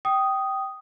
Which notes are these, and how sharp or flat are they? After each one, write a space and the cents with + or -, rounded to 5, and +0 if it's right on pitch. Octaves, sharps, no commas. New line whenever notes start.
G5 -15 D#6 +0